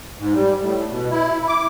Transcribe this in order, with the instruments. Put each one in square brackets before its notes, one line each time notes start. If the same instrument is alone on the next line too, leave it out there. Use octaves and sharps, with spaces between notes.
[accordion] G#2
G3
A2
B2
E4
D6